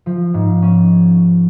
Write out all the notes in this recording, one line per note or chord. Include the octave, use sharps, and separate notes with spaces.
F3
G#2
C#4